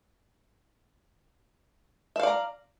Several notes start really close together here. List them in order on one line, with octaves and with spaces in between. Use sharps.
E5 F5 D5 A#5